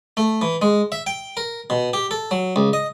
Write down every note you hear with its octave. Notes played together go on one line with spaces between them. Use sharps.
A3
E3
G#3
E5
G5
A#4
B2
G4
A4
F#3
C#2
D#5